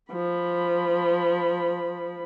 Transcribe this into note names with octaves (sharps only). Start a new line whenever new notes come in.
F3 B5